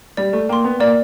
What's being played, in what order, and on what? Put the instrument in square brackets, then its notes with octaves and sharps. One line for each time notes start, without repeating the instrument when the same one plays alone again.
[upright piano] G3 [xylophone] D5
[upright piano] A3
[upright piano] A#3 [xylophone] G5 C6
[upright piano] B3
[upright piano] A#3 [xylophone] D5